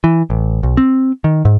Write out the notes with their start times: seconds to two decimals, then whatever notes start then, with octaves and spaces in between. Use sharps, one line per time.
0.04 E3
0.30 A1
0.63 B1
0.77 C4
1.24 D#3
1.45 G#2